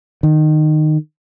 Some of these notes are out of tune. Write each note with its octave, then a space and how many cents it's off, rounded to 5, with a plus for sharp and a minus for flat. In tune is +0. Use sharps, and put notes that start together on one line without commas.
D#3 -15